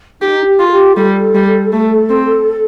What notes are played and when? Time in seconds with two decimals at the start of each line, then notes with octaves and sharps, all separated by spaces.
0.21 D#4 G4
0.46 G4
0.59 F4
0.67 A4
0.71 G4
0.97 G3 A4
1.34 G3
1.72 A3
2.10 C4